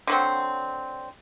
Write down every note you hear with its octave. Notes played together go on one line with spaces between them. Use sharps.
D3 F#3 C4